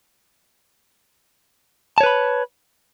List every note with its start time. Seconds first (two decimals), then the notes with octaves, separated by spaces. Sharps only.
1.98 A5
2.01 C#5
2.03 B4
2.06 B5